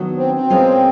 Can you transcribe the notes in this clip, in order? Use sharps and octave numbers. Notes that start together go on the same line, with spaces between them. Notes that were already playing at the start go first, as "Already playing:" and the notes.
Already playing: D#3 F#3 B3 D4 F#4
C4
C4
B2 G#3 C#4 F4 A#4